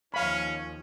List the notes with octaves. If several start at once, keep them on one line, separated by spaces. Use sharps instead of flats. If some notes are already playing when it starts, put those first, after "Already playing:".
D#2 F3 C#4 F5 B5